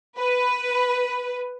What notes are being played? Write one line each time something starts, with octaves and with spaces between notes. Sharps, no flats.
B4